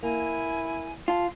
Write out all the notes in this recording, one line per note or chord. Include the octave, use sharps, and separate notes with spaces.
A#3 E4 G#5
F4 A5